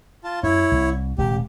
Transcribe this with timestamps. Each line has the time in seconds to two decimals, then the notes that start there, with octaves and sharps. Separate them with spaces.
0.24 F4 A5
0.43 F#2 E4 C#5
0.72 C2
1.18 D#1 C3 G#3 G4